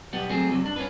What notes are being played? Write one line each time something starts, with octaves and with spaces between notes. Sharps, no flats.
B1 B2 G3 B3
F#3 A3 C4 G#4
G2 C3 E3 F#3
G2 D4
C#4 D4 B4